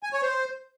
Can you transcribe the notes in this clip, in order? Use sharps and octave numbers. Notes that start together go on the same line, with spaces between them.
G#5
C#5
C5